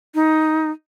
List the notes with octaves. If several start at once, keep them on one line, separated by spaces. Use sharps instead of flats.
D#4